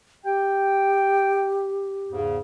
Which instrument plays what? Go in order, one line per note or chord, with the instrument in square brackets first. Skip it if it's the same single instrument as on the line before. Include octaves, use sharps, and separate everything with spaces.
[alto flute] G4 [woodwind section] G5
[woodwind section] E2 G#2 C#3